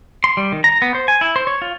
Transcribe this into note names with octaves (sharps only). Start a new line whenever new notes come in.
C6
G3
D#3
A#5
B3
C5
G#5
E4
C5
C#5
F4